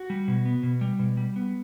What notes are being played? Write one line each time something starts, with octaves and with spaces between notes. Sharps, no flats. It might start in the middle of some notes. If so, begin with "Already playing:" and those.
Already playing: F#4
G3
B2
B3
B2
G3
B2
G3
B3